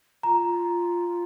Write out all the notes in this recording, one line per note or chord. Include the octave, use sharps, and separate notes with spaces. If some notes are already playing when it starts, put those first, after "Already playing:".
F4 A#5